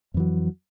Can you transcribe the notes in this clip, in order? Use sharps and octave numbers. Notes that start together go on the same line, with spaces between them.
F2 E3 F#3